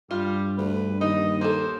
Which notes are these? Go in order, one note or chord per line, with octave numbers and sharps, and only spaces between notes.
G2 G3 F4
D2 B4
D#2 D#4 D#5
A#3 A4 C5